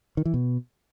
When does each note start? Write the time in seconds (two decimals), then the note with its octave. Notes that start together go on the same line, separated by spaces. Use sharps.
0.17 D#3
0.25 E3
0.34 B2